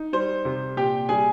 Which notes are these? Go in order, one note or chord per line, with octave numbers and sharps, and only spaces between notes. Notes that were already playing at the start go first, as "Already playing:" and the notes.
Already playing: D#4
G3 C5
C3
A#2 G4 G5
G3 G#4 G#5